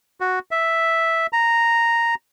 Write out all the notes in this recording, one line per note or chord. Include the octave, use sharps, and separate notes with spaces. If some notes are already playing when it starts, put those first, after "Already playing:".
F#4
E5
A#5